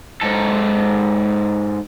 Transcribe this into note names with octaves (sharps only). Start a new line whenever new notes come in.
G#2 A4